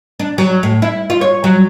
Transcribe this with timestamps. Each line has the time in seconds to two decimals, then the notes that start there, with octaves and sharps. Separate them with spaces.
0.20 D4
0.38 F#3
0.63 A2
0.82 E4
1.10 F4
1.21 C#5
1.44 F#3